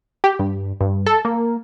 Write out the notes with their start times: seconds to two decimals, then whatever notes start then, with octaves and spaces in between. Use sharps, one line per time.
0.24 G4
0.39 G2
0.81 G2
1.06 A4
1.25 A#3